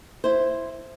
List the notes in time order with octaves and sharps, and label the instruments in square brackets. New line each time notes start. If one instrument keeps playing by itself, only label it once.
[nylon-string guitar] E4 C5